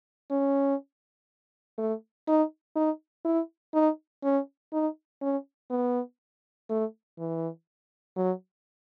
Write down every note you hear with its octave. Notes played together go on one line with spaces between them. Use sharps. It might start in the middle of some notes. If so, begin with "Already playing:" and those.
C#4
A3
D#4
D#4
E4
D#4
C#4
D#4
C#4
B3
A3
E3
F#3